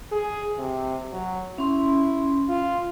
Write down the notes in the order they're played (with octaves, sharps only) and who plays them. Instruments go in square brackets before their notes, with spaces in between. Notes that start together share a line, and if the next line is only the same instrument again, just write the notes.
[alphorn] G#4
C3
F#3
[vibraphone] C#4 C6 [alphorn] E4
[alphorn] F4